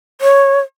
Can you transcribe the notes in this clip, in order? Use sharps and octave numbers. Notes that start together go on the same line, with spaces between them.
C#5